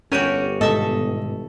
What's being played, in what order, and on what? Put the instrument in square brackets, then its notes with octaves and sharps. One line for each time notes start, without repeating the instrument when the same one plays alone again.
[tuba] G1 [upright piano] C#4 D#7 [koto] F#4 G4 A#4
[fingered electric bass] G#2 B2 D#3 [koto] A4 E5 A5 [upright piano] D#5